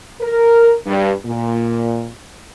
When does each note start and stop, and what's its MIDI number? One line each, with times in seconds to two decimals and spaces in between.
0.21 0.74 70
0.86 1.11 43
1.26 2.09 46